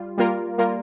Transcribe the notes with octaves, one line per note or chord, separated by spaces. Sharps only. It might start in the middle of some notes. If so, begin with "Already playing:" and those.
Already playing: G3 F4
G3 A#3 F4 A#4
G3 A#3 F4 A#4